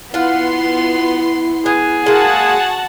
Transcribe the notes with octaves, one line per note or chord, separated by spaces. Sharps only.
B3 E4 F4 F#5 C6
B3 G#4
G#3 A#3 F#4 F#5 A5